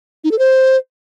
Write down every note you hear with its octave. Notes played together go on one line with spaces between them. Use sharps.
D#4
A4
C5